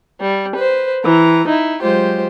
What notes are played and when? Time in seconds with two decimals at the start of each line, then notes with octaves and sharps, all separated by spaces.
0.20 G3
0.55 B4 C5
1.03 E3 A#5
1.47 D#4 E4
1.81 F#3 G#3 F4 G4 C5